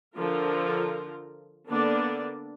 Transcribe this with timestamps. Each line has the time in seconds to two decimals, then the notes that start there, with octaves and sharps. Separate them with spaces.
0.17 D3 F3 F4 A#4
1.68 D3 A#3 B3 D4 D5